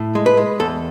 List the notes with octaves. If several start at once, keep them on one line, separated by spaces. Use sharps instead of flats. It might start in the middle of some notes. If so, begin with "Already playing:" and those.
Already playing: A2
G#3
B4
G#3
E2 A4